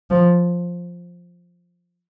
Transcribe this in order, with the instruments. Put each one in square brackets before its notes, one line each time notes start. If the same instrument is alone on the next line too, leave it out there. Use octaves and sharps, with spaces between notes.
[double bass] F3